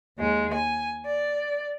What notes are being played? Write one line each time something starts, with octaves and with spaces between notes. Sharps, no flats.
D#2 G#3
G#5
D5